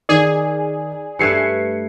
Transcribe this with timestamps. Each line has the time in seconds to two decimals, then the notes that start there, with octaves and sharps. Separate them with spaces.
0.09 D#3 G#4 D5
1.19 G2 A3 B4 G#6 C7 C#7